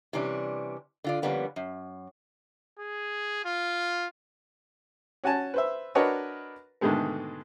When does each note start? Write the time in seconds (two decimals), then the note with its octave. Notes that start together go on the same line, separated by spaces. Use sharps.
0.13 C3 E3 G3 C#4 D4
1.04 D3 F4 D5
1.22 F2 D3 G3 A#3 B3 C#4
1.56 F#2
2.79 G#4
3.45 F4
5.24 C#4 F#4 G#5 A5
5.54 B4 C5 E5
5.95 D4 F#4 A#4 B4 C#5 D#5
6.81 G#2 B2 D3 D#3 G#3 A3